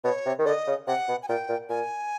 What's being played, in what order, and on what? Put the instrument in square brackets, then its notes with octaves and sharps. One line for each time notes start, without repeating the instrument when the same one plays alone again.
[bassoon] B2 [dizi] C#5
[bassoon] C3
D#3
[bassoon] D3 [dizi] D#5
[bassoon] C#3
[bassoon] C3 [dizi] F#5
[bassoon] B2
[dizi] G#5
[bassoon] A#2 [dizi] G5
[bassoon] A#2
[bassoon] A#2 [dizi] G#5